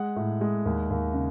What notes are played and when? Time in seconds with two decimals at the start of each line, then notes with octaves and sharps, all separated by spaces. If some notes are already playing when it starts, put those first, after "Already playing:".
Already playing: G#3 F#5
0.16 A2
0.41 G#3
0.65 D#2
0.90 D#2
1.14 C#3